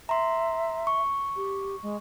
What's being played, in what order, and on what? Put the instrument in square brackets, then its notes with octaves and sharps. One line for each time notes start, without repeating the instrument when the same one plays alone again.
[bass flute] E5 [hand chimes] A#5 C6
[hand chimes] C#6
[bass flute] G4
G#3